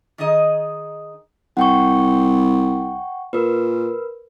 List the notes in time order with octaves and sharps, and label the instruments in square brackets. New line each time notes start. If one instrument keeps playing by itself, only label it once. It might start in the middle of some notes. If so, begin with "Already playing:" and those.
[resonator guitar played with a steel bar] D#3 D#4 G#4 D#5
[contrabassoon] C2 [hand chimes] F#5 G5 C#6
[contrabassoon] A#2 [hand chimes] A#4 B4